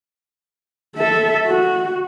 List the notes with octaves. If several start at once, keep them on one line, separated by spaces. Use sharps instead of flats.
A4 E5
F#4